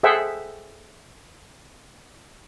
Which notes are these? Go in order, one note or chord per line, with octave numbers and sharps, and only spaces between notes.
G#4 A4 C5 E5 F#5 G5